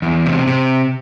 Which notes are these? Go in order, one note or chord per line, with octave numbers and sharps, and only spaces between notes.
E2
C3
C3